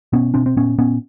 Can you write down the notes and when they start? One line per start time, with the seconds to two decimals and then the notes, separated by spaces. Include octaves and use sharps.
0.13 B2 B3 C#4
0.34 B2 C4 D4
0.46 C4
0.57 A#2 B3 C#4
0.78 A#2 B3 C#4